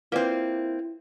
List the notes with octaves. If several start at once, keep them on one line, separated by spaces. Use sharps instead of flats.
A#3 C4 E4 F4 B4 D5